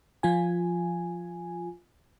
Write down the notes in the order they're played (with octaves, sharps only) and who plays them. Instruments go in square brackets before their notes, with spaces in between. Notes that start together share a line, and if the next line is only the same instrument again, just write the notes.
[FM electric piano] F3 F4 G#5